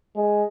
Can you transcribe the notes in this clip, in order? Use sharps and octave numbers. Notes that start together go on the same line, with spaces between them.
G#3